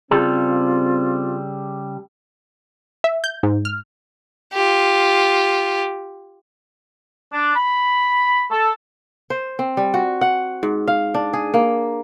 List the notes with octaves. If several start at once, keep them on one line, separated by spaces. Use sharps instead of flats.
C#3 G3 C4 F4 G#4 A4
E5
G6
G#2
F6
F4 G4
D4
B5
A4
C5
C4
G3
F#4
F#5
G#2
F5
D4
G#4
A#3